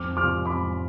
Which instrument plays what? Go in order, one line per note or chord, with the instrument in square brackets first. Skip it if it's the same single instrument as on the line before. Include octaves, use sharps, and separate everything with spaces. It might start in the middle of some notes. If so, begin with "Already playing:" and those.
Already playing: [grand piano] F2 D6 F6
C3 F3 D6 F6
F2 B5 D6